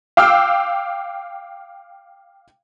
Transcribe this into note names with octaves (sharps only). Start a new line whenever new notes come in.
F5 G5 D6 E6 F6